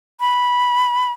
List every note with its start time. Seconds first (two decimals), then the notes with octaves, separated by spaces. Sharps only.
0.20 B5